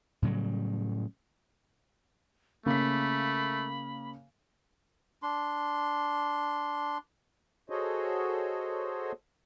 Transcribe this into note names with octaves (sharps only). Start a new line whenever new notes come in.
A2 C#3 F#3 G3
C#3 A3 A#3 B5 B6
D4 C6
F#4 G#4 A4 C5 C#5 D#5